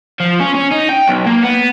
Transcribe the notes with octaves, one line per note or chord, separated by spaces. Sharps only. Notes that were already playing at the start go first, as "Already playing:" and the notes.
F3
C#4
C#4
D#4
G5
B1
A#3
B3